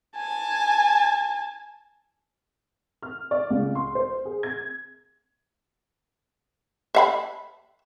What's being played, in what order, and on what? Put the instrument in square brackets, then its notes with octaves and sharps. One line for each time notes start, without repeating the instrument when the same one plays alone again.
[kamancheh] G#5 A5
[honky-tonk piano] F6
D5
C#2
C6
C5
G#4
G#6
[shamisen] E5 F5 B5